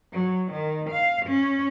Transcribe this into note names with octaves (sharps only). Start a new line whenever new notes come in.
F#3
D#3
F5
C#4